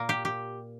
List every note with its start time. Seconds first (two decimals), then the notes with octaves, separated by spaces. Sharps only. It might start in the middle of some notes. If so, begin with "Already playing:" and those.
Already playing: A#2 A#3
0.09 G4
0.25 G4